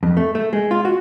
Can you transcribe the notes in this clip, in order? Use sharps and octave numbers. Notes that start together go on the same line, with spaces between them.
F2
A3
A3
G#3
F4
F#4